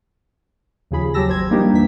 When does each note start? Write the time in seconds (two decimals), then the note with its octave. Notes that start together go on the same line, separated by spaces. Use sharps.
0.91 D#2 C#3 F3 G#4 B5
1.14 F#3 G4 A5 E6 A#6
1.28 G#1 C5 G#6
1.50 F3 G3 A#3 D4 D#4 G4
1.72 G#1 F2 E3 B6